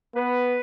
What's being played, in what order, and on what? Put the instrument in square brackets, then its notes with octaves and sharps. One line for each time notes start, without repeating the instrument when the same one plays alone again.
[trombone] B3 [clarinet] B4